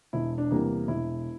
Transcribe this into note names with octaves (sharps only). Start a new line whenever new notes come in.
E1 E4
D4
E2 C3 G3 A#3
E1 E4